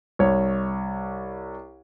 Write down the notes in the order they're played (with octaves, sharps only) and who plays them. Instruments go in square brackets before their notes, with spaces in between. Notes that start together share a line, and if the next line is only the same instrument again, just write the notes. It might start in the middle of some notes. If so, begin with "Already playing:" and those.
[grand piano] C2 C#5